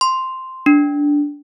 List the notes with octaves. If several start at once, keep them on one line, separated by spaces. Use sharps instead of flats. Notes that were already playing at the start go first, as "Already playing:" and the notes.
C6
D4